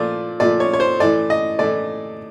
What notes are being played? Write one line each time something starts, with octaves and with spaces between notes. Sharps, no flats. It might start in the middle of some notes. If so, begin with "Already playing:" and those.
Already playing: A#2 F3 A3 D5
A#2 F3 A3 D5
C#5
C#5
C5
A2 E3 A3 D5
D#5
A2 E3 A3 D5